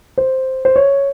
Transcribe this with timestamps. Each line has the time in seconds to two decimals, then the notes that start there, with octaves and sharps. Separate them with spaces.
0.18 C5
0.65 C5
0.76 C#5